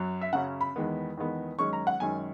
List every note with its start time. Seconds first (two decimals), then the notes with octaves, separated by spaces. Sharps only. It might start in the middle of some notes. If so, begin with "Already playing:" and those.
Already playing: F#2 F#3
0.21 E5
0.33 F#2 C#3 F#3 C#4 F#5
0.61 B5
0.76 E2 D#3 G#3 B3
1.17 E2 D#3 G#3 B3
1.59 F#2 D#3 G#3 C#4 C#6
1.73 A#5
1.87 F#5
2.00 F#2 D#3 G#3 C#4 G#5